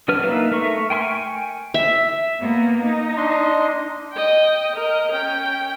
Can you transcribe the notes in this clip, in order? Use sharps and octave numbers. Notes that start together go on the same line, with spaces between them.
F#3 D4 B4 F6
A#3 D#4 B4 E5 F5
A3 A#4 E5 A#5 C#6
G5 G#5 C6 C#6 F6
E5
A#3 B3
D#4
D4 D#5 C6
D#5 G5
A#4 D#5
C#4 G5